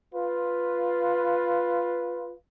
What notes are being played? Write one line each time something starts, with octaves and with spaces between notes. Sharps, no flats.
F4 B4